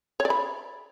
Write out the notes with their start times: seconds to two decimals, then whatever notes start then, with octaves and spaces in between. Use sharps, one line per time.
0.20 C#5
0.25 D5
0.30 B5